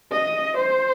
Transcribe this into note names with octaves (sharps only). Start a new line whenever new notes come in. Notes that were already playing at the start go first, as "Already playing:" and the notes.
D#5
C5